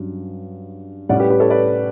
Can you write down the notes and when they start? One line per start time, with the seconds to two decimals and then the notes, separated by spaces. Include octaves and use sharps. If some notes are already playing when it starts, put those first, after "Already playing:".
Already playing: G2 F#3 C#4
1.09 A2 G3 C#4 D5 F#5
1.20 G4 B4
1.30 G4 B4
1.40 A4 C#5
1.50 B4 D5